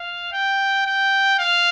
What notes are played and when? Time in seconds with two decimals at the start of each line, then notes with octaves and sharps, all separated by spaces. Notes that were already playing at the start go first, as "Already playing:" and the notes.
Already playing: F5
0.32 G5
0.86 G5
1.38 F5